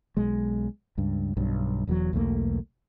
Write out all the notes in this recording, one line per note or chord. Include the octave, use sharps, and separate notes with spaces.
B1 G#3
C#2 G2
B1 G2
E1 E2 F3 F#3
B1 E2 A3 A#3